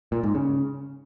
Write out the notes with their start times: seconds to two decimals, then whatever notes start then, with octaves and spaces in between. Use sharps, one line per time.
0.12 A#2
0.23 G#2
0.35 C#3